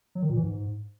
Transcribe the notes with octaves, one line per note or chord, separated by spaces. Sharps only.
F#3
D#3
A#2
E3
G#2